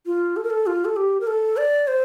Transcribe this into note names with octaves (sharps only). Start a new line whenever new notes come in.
F4
A4
A#4
A4
F4
A4
G4
A#4
A4
D5
C5